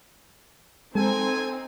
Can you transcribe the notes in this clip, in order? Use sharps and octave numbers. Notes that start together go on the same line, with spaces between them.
G#3 C4 D#4 A4 G#5